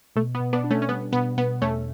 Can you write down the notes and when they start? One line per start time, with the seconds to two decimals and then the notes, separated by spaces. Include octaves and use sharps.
0.16 B2 A3
0.35 B3
0.40 B2
0.53 B3 D4
0.64 D4
0.71 A3 C#4
0.82 C#4
0.89 G3 B3
1.13 B2 B3
1.37 B2 B3
1.62 E2 A3 C#4